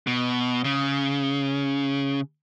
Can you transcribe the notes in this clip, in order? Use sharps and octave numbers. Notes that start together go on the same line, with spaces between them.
B2
C#3